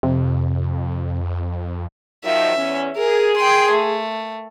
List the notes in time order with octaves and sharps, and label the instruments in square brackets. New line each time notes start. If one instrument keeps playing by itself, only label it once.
[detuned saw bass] F2 [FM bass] C3
[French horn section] D#3 F3 F#3 [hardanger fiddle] E5
[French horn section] E2 C#4
[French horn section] G#4 [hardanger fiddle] A#4
[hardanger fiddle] G5 C6
A3